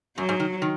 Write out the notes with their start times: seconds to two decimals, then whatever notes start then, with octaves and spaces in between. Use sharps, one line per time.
0.17 F#2 F#3
0.29 G#2
0.40 D#3
0.62 D#3